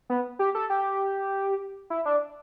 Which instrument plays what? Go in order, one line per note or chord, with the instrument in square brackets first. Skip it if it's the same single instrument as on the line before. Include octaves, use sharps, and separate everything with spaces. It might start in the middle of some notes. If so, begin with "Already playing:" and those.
[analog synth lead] B3
G4
A4
G4
E4
D4